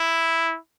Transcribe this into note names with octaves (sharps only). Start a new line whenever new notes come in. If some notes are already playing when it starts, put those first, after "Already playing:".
Already playing: E4